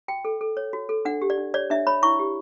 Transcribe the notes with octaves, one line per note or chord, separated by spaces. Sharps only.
F#4 G5
A4
A4
C#5
F#4
A4
D4 F#5
G4
D5
D4
C#5 D5
D4 E5
C#5 B5
E4 C#6
G4